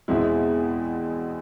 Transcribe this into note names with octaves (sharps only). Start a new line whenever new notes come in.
E2 B2 G#3 C4 E4